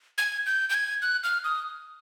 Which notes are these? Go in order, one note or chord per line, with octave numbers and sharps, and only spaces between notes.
G#6
G6
G6
G#6
F#6
F6
D#6